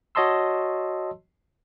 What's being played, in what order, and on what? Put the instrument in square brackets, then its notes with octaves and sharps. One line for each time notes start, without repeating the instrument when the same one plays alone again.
[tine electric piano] F#4 C#5 D#5 A5 C6 E6